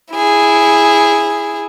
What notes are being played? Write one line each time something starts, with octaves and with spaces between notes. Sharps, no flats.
E4 G#4